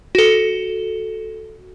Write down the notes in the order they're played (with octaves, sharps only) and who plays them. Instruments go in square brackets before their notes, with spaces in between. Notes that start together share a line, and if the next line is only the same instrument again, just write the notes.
[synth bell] F#4 A4